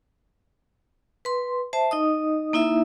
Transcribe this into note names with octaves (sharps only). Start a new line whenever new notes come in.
B4 C6
C5 E5 A5
D#4 D#5 D#6
A#3 D#4 E4 E5